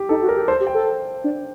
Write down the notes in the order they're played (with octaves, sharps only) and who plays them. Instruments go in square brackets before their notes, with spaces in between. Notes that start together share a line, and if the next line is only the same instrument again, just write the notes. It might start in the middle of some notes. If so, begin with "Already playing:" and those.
Already playing: [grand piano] G4
[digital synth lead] D#4 [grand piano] A4
[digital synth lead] F#4
[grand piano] A#4
[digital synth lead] G4
[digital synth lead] A4 [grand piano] C5
[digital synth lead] G4
[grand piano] G5
[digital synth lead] A4
D4